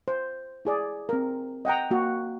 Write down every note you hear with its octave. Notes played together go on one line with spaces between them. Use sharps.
C5
E4 G#4 D5
C4 A#4
D#5 F#5 G5 A#5
A#3 F#4